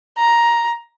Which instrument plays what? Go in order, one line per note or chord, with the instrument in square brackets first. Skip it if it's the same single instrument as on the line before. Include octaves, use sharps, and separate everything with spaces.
[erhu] A#5